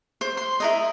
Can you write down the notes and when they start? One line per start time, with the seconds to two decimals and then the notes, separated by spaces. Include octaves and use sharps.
0.21 C5
0.37 C6
0.60 E4 A#4 D#5